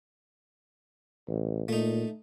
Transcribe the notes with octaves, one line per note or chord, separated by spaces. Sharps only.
A1
A#2 A3 D#4